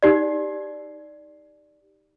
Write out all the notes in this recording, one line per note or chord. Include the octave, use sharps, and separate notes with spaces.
D#4 G4 D5